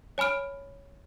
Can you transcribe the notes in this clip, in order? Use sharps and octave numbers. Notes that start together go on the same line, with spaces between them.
C#5 G#5 B5 F6 D7